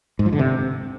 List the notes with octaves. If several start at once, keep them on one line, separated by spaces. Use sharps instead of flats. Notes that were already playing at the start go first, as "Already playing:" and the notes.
G#2
F3
D3
C3